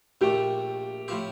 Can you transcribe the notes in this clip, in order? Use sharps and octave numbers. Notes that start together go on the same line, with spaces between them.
A#1 A#2 A3 G4
A2 F3 C4 G4